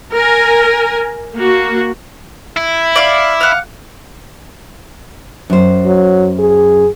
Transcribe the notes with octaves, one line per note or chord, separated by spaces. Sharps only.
A#4 G#5
A#3 F#4
E4
D5 F5
F5 F#5
F#2 C5
F#3
G#4